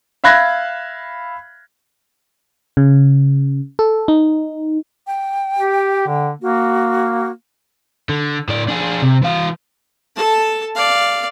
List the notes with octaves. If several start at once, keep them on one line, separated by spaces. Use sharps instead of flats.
E5 F5 B5 F#6 G#6 A#6
C#3
A4
D#4
G5
G4
D3
A#3 F#4
D3
A2 D5
D4 G#4
C3
E3 F5
A4 A5
D5 F5